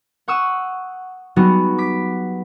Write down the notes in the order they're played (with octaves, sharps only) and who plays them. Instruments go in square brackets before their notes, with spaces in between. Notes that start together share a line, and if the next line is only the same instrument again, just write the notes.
[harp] F#5 C#6 D#6 E6
F#3 G3 B3 D#4 F#4 G#4
D6 B6